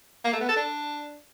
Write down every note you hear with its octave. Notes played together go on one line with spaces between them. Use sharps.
A#3
A3
B3
A4
D4